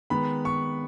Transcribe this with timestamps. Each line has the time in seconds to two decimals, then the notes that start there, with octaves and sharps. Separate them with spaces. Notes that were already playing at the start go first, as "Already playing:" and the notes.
0.10 D#3 G#3 B3 B5
0.45 C#6